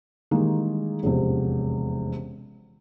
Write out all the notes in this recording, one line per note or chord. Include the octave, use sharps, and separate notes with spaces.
D#3 E3 G3 G#3 A#3 G#4
E1 A1 F2 C3